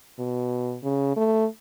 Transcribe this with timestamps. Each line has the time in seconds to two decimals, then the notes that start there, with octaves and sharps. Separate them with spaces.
0.19 B2
0.83 C#3
1.16 A3